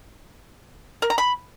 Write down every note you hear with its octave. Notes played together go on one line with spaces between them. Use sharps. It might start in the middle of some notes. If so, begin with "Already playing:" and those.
A#4
A#5
B5